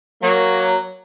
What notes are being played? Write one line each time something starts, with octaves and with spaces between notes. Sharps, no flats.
F#3 A#3